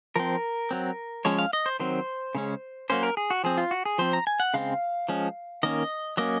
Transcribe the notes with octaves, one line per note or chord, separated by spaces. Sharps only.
F3 C4 A#4
F#3 C4
F3 G#3 C#4 C#5
F5
D#5
C5
D#3 F#3 C4 C5
C#3 G#3 C#4
F#3 A#3 C#4 C5
A#4
G#4
F#4
F3 C4 G#4
F4
F#4
G#4
F3 C4 C5
A#5
G#5
F#5
C#3 G#3 C4 F5
F3 G#3 C#4
D#3 A#3 C#4 D#5
F#3 A#3 C#4 D#5